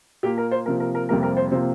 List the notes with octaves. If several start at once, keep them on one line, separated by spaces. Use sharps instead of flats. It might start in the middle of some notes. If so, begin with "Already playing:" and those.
A#2 A#3 G4
A#4
C5
C3 F3 A#3 A#4
A#4
A#4
F2 C3 G3 A#3 A#4
A#4
C5
C3 F3 A#3 C5